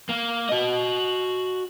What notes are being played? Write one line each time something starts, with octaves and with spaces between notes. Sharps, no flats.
A#3
F#4 D#5